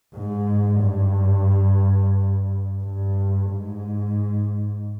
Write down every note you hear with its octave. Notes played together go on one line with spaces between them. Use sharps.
G#2
G2
G2
G#2